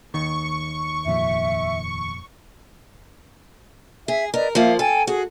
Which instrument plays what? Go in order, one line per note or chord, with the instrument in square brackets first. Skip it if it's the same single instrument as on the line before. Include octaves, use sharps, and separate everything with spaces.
[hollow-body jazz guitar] D#2 D#3 [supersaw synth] C#6
[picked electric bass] F1 A#2 F3 [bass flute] E5
[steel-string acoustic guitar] G#4 [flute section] E5
[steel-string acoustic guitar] A#4 [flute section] B4 D5 D#5
[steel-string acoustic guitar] F3 A#3 [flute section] E5 F5
[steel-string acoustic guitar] A4 [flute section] G5 G#5
[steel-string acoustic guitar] F#4 [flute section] G#4